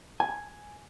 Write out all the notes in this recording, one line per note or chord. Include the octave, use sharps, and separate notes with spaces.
G#5